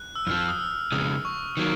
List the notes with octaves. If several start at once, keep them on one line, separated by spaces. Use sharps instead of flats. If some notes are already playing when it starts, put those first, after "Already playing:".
Already playing: F#6
E6
F2 D3 F3 F6
D#6
E6
F2 C#3 G#3 D#6
C#6
D#3 F#3 A#3